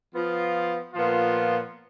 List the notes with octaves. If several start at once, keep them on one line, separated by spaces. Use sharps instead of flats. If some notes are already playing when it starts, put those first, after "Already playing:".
F3 B3 F4
A#2 F3 B3 F4